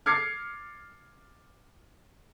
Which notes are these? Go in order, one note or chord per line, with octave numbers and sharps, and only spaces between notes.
D6 F6 G#6 A6 C7 C#7